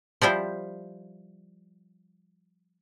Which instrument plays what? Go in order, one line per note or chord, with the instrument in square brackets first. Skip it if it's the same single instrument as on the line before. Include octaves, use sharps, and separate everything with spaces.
[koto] F3 G3 E4 F4